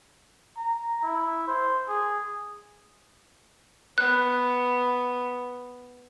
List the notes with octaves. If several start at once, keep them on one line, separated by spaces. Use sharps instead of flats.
A#5
E4
C5
G#4
B3 F#6